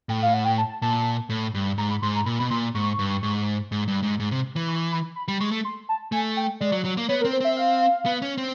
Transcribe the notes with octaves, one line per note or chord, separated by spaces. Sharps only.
A2 G5
F5
F#5
G5
A5
A5
A#2 A5
A2
G2
G#2 A#5
B5
G#2 C6
A#5
A#2 B5
B2 B5
A#2 C6
G#2 C#6
G2
G#2
G#2
G2
G#2
G#2
C3
E3
C#6
B5
B5
G3
G#3 C#6
A3
C6
A5
A3 G#5
G5
G#3 D5
F#3
F#3
A#3
B3 C#5
A#4
C4
C5
C4 E5
F5
B3
C#4
C4